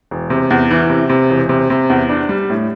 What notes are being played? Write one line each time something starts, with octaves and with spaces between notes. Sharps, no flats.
E1
C3
E2
E3
C3
C3
E1
C3
C3
E2
D4
G3
A2